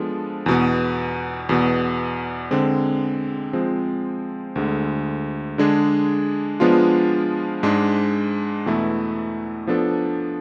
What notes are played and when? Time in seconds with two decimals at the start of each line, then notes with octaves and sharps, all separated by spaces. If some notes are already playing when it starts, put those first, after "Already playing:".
Already playing: F3 G#3 B3 D4 A4
0.46 E2 B2 B3
1.49 E2 B2 B3
2.51 D3 G#3 C4
3.53 F3 G#3 C4
4.56 D2 D3 G#3
5.58 D3 G#3 D4 G#4
6.60 F3 G#3 B3 D4 F4
7.63 G#2 G#3 D4
8.66 E2 B2 A3 E4
9.67 F3 B3 D4 A4